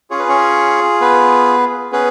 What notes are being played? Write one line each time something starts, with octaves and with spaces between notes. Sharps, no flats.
C#4 F4 G#4 C#5
B4
C#4 C#5
B3 B4
B3 C#4 G#4 B4